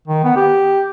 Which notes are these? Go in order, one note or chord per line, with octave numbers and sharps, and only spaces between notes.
D#3
B3
G4